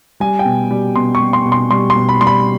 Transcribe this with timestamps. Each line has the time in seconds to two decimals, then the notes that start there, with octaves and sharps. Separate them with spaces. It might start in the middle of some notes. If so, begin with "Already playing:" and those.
0.20 G3 G#5
0.39 G5
0.45 B2
0.71 G3
0.96 B2 C6
1.15 C#6
1.20 G3
1.33 C6
1.45 B2
1.52 C6
1.71 G3 C6
1.90 C6
1.96 B2
2.09 B5
2.21 G3 C6
2.27 B5